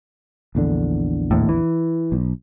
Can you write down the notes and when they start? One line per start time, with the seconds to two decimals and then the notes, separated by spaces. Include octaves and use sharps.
0.55 A#1 E2 D3
1.31 D#2 A2
1.49 E3
2.12 B1